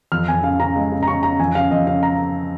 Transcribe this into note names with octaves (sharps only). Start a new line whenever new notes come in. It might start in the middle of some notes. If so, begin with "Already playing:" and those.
F2 F6
F2 G#5
C#3 F5
C#3 A#5
G#3
C#3
A#5
C#3 C#6
C#3 A#5
F2 G#5
C#3 F5
F2 D#5
C#3 F5
A#5